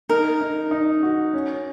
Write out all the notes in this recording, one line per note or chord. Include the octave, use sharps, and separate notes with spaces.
D#4 A#4
D#4
D#4
F#4
C#4